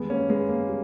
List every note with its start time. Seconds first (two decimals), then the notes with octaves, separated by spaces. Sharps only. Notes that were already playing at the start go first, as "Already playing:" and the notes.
Already playing: E2 D#3 G3 G#3 B3
0.10 A#3 C#4
0.30 G#3 B3
0.49 A#3
0.69 G3